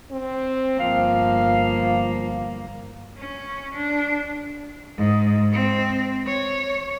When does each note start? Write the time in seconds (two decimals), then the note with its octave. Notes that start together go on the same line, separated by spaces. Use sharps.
0.11 C4
0.80 G1 F3 A#3 F5
3.18 C#4
3.74 D4
4.97 G#2
5.52 C4
6.26 C#5